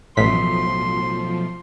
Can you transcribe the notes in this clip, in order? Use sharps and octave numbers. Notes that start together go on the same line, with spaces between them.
A1 B2 F3 F#3 A3 C6 B6